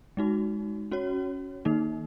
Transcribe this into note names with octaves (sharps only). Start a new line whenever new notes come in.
G#3 D#4 F#4
C#4 F#4 C#5
D#3 A#3 D#4